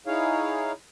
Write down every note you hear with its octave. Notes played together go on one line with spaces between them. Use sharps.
D#4 E4 G#4 C#5 F5